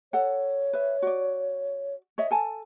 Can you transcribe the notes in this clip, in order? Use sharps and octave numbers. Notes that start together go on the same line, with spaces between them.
A4 C#5 F#5
B4 E5
F#4 D5
C#5 D#5 E5
A4 G#5 A5